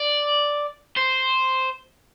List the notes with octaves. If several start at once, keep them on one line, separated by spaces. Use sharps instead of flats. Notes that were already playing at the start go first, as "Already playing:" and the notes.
Already playing: D5
C5